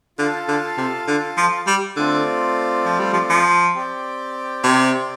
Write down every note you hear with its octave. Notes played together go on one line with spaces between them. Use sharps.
D3 F4 A4 F5 A5
D3
C3
D3
F3
G3
D3 A3 C4 F4 D5
F3
G3
F3
F3
C4 G4 D5 G5
C3